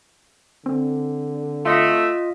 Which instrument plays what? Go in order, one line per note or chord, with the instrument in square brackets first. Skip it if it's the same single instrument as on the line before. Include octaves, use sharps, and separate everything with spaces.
[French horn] D3 [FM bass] C4
[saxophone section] A3 [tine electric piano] F4 D#5 B6